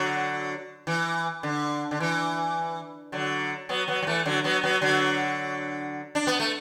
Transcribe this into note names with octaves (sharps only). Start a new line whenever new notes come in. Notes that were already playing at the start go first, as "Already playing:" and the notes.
Already playing: D3 F#3
E3
D3
D3
E3
D3 F#3
F#3 B3
F#3 B3
F#3
E3 A3
D3 F#3
F#3 B3
F#3 B3
D3 F#3
D4
B3
A3